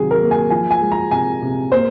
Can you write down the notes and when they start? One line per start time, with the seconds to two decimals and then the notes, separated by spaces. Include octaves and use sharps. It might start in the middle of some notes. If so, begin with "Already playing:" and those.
Already playing: C3 D#3 F#3 G#4
0.11 A#4
0.21 A#3
0.31 G#5
0.50 F3 G#5
0.71 G#5
0.81 G#3
0.92 A#5
1.11 C3 G#5
1.42 C3
1.72 A#3 C5